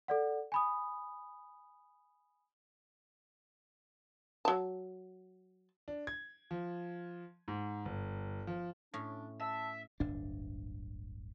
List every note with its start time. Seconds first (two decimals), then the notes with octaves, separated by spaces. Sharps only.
0.08 A4 D5 F#5
0.52 G#5 B5 D#6
4.45 F#3 A5
5.88 D4
6.07 G#6
6.51 F3
7.48 G#2
7.85 G1
8.47 F3
8.94 A2 C#4 D4
9.40 E5 A5 E6
10.00 D1 G1 D4